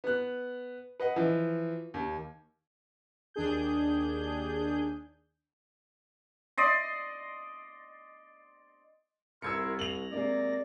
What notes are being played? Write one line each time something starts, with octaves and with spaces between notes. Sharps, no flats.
B3 F#6
B4 D#5 F#5
E3 F3
D#2
D#2 D4 G#4 G6
D5 D#5 C6
C2 E4 F4 A#4 E6 G#6 C#7
A#6 F7 F#7
C3 G#3 A#3 D5